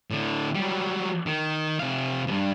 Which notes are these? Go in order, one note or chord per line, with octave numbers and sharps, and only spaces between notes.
A2 D3
F#3 G3
D#3
C3 F5
C#2 G2